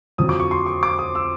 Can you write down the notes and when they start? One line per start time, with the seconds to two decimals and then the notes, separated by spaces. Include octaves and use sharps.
0.18 F2 D3 F#3 D#6
0.29 D6
0.40 C#6
0.51 C6
0.66 C#6
0.83 D6
0.99 D#6
1.15 E6